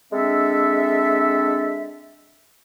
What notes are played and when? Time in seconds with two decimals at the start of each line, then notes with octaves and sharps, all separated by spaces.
0.13 G#3 C4 D4 A4 E5